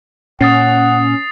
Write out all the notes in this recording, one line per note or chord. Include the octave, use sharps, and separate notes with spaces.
A#2 C#4 F#5 D#6 A6 C7